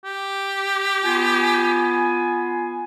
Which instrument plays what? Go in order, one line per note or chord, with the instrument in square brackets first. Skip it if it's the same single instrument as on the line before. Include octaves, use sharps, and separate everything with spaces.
[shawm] G4
[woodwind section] B3 F4 G#5